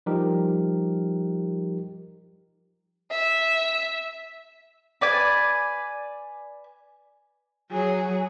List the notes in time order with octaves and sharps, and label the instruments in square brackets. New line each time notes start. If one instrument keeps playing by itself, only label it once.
[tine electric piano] F3 G3 D#4 G4 A#4
[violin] E5
[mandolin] B4 D5 G#5
[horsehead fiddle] F#3 G#4